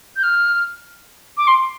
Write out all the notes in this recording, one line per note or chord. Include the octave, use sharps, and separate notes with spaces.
G6
F6
D6
C6